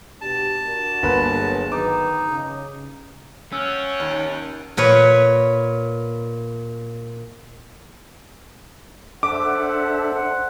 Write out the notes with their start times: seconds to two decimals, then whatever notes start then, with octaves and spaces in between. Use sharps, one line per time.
0.21 B2 D4 G4 A5
0.65 D4 F#4 A#4
1.03 G1 A#3 B4
1.35 F#3 B3 G#4
1.72 D#3 F#3 D#4 B4 D6
2.28 C#3
3.52 C#4 F4 F#5 G5 E6 F6
4.00 D#2
4.77 A#2 B4 C#5
9.23 D4 A4 C5 E5 F#5 D6